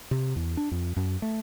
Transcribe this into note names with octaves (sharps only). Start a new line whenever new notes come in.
C3
E2
D4
F2
F#2
A3